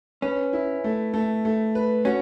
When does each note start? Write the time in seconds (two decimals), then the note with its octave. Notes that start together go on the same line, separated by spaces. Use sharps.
0.22 C#4 B4
0.53 E4
0.84 A3
1.14 A3
1.45 A3
1.75 B4
2.05 C#4 F#4